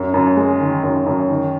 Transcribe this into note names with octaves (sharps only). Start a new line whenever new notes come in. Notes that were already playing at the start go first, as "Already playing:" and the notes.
Already playing: F#2
F#2
G#3
D#3
F#2
F#2
D#3